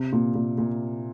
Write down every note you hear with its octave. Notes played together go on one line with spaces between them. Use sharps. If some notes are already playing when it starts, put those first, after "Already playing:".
Already playing: C3
A#2
A#2
A#2